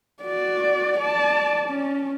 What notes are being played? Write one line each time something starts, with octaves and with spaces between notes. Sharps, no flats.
F#4 D5
D5 A5
C#4